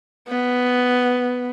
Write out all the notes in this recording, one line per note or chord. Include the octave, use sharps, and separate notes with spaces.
B3